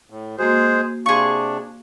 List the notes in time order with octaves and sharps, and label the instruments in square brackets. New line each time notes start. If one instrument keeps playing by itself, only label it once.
[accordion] A2
[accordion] G#3 G#4 C5 [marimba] A#3 F#4
[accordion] C3 D4 [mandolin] G#4 C#6 [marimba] F5 C6